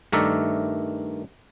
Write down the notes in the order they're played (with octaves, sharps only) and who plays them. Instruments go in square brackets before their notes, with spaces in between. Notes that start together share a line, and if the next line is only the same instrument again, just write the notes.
[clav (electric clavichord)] G2 D#3 A3 A#4 D5 E5